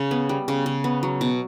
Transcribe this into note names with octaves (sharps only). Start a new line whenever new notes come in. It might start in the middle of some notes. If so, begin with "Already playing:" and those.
Already playing: C#3
B3
G3
C#3
C#3
B3
F#3
B2